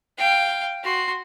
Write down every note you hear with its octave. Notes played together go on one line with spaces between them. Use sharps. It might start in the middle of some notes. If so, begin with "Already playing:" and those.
F5 G5
F#4 C6